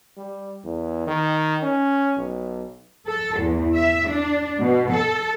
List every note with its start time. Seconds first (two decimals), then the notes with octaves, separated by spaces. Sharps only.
0.18 G3
0.64 E2
1.07 D#3
1.63 C#4
2.18 B1
3.06 A4
3.40 E2
3.75 E5
4.09 D4
4.60 B2
4.92 A4